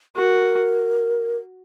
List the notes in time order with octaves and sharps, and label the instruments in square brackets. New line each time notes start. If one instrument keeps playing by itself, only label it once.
[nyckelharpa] F#4 [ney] A#4